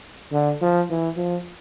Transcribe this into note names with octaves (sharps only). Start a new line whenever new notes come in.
D3
F3
E3
F3